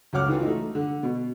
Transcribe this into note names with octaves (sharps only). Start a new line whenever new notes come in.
C#2 F#3 C#5 F#5 D6 F6
D#3 E3 F4 F#4
A3 D#4
D3
B2